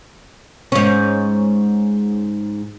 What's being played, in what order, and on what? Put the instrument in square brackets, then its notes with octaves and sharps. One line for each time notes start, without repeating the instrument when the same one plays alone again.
[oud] G#2 C#4